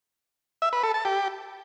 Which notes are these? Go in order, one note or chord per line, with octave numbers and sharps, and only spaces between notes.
E5
B4
A4
A5
G4